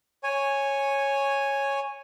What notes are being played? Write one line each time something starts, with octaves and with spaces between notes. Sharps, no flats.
C#5 G#5